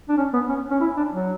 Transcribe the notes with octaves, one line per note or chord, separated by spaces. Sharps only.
D4
C#4
B3
C#4
C#4
E4
D4
F#3